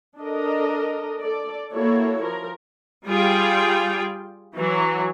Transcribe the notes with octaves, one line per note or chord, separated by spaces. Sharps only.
D4 A4 A#4 D#5
A4 D5
A#3 E4 F#4 A4 C#5
F3 A#4
G3 F4 G#4 G5
E3 F#3